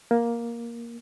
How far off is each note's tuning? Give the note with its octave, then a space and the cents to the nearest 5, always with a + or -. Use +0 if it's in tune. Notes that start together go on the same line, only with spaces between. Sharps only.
A#3 +10